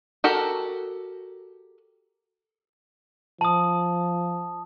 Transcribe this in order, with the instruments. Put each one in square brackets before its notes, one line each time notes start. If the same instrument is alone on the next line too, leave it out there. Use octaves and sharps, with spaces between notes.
[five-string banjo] F#4 G4 A4 A#4
[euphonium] F3 [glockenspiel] A5 D#6